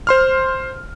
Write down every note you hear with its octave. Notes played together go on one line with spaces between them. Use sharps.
C5 C6 F6